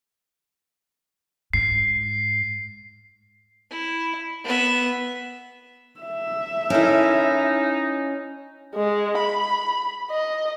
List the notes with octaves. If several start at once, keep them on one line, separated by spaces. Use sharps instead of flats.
G#2 C7
E4
B3 E5
E5
C#4 D#4 E4 A4 A#4
G#3
B5
D#5